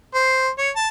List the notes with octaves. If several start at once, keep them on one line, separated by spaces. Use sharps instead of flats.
C5
C#5
A5